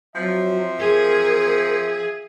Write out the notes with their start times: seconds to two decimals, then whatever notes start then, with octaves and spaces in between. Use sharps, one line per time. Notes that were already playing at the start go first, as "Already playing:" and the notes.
0.16 F3 F#3 C4 E5
0.79 G#4 A#4